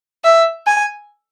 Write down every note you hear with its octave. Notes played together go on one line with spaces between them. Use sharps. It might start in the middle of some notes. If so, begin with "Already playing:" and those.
E5
G#5